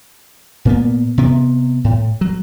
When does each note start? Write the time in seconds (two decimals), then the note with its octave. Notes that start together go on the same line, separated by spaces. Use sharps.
0.65 A#2 A#3 B3
1.18 C3 B3
1.84 A2
2.21 F#3